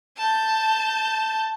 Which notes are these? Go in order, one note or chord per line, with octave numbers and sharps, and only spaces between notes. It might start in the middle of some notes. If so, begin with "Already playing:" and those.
A5 G6